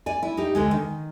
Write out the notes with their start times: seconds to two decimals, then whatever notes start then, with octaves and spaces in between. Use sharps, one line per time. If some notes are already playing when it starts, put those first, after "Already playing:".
0.06 D5 G#5
0.23 E4
0.37 D#4 G4
0.55 D2 D3 G#3
0.71 D#3